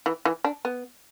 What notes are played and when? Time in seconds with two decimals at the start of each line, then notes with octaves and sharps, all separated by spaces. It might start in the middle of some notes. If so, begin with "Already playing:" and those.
0.06 E3
0.25 E3
0.44 D4
0.65 B3